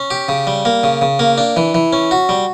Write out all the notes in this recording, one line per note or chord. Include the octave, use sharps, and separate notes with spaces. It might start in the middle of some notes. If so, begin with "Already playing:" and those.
Already playing: C#4
G4
C#3
G3
A#3
C#3
C#3
A#3
D4
E3
E3
C#4
F#4
G3